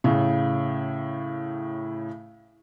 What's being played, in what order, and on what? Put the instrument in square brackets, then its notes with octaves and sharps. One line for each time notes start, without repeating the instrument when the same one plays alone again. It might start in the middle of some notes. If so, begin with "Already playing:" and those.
[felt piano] A2 C#3